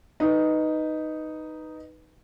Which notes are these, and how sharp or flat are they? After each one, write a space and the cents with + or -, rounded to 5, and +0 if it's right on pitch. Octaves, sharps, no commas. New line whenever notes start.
D#4 +0 B4 +0